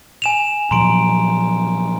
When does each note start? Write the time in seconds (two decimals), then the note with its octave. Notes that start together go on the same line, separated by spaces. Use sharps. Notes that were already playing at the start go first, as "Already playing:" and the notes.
0.22 G#5 E7 F7
0.71 A#2 F3 F#3 A#5 C6 D7